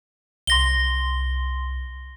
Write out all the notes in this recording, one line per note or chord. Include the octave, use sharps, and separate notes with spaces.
C2 C6 A#6 G7